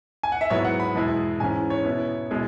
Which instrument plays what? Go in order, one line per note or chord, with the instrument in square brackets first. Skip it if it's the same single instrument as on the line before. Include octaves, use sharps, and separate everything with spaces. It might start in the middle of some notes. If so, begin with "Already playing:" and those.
[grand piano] G#5
F#5
E5
G#2 F#3 B3 E4 C#5
F#5
B5
E2 B2 G#3 E4
G#2 E3 C#4 G#5
C#5
B2 B3 E4
B2 G#3 E4